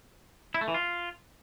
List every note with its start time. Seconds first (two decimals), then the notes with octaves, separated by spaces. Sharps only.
0.54 E4
0.61 A3
0.68 E3
0.74 F4